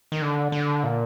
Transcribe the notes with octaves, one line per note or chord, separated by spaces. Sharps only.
D#3
D3
D3
A#2